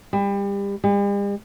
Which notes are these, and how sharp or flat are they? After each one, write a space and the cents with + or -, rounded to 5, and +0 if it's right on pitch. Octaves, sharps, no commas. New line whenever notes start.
G3 +30
G3 +45